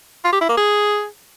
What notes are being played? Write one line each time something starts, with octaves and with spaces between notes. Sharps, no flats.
F4
G4
E4
A#3
G#4